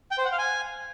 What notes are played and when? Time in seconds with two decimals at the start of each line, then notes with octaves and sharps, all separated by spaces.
0.11 G5
0.18 C5
0.25 F#5
0.32 F5
0.39 G#5